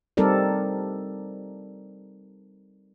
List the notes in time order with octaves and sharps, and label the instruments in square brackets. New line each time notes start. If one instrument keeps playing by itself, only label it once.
[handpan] G3 C4 D#4 A4 A#4 D5